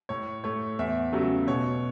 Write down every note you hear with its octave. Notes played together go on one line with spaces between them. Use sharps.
A2 C#5
A3 C#5
E2 E5
C#3 F#3 A3
B2 C#5